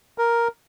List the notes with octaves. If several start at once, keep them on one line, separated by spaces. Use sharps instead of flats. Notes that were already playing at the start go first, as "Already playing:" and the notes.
A#4